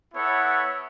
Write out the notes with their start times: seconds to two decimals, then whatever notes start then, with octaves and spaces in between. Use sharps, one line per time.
0.14 B3 E4 A4 C#5 F#5